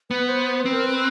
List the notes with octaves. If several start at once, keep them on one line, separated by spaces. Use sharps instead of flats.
B3 B4
C5
C5
B4
C4
A#4
B4